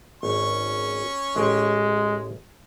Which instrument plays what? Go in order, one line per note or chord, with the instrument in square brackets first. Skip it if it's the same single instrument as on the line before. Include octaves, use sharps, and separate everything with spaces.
[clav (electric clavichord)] G#1 [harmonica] C#4 C#6
[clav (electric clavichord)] A1 G#4 G5 [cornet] G#3